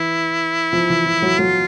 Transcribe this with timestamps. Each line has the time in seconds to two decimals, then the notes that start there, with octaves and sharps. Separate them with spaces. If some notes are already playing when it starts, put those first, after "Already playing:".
Already playing: E3 E4
0.73 F3
0.90 E3
1.06 F3
1.22 F#3
1.39 F#3 F4